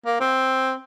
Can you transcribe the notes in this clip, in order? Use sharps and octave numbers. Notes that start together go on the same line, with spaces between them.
A#3
C4